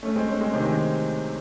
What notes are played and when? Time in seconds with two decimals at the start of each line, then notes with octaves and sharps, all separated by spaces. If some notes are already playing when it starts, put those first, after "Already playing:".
0.03 A3 C#4
0.16 G#3 C4
0.28 A3 C#4
0.41 G#3 C4
0.53 C3 D#3
0.66 G#3 C4